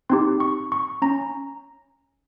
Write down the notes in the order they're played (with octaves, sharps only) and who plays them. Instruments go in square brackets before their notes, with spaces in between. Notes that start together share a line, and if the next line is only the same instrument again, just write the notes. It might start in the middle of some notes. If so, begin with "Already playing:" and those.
[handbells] C4 D#4 G4 C6
C#6
C#6
C#4 A#5